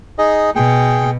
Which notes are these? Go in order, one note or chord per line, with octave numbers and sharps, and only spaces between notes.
D#4 G#4 D#5
B2 G#4 G5